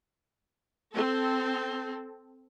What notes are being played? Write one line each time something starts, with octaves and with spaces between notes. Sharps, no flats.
C4 A4